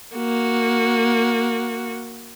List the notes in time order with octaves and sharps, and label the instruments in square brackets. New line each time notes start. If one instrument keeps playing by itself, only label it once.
[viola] A#3 F#4